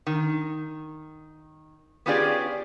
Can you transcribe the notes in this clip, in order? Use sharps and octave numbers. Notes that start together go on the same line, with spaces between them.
D#3
B3 C#4 F4 G4 G#4 D5